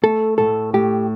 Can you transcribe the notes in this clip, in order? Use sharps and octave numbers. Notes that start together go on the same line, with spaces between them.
A3 A4
A2 A4
A2 G4